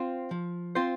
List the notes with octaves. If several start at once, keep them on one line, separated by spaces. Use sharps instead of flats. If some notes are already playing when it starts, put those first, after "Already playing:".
Already playing: C4 F4 C5
F3
C4 F4 C5